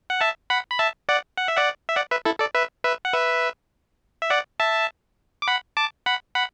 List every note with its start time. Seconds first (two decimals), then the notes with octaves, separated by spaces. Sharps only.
0.10 F#5
0.21 E5 A5
0.50 F#5 B5
0.71 B5
0.79 E5 A5
1.09 D5 F#5
1.38 F#5
1.48 E5
1.57 D5 F#5
1.89 E5
1.96 D5 F#5
2.11 B4 E5
2.25 E4 A4
2.40 A4 D5
2.55 B4 E5
2.84 B4 E5
3.05 F#5
3.13 B4 E5
4.22 E5
4.30 D5 F#5
4.60 E5 A5
5.42 D6
5.48 F#5 B5
5.77 A5 D6
6.06 F#5 B5
6.35 F#5 B5